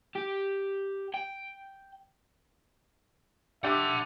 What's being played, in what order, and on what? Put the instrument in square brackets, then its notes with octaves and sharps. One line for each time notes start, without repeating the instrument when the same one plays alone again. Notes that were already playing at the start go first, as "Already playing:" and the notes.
[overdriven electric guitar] G4
G5
[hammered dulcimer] D4 G4 D5 [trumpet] E5 [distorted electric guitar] F#5 C6